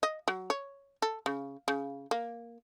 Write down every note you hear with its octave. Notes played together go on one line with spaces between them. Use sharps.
D#5
F#3
C#5
A4
C#3
C#3
A#3